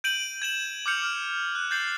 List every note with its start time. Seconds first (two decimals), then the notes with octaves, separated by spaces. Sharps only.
0.04 G6 D7 D#7 F#7
0.42 G#6 E7 F#7
0.86 D6 F6 G6 C#7 F7
1.03 F6
1.55 F#6
1.71 G6 A6 C7 F#7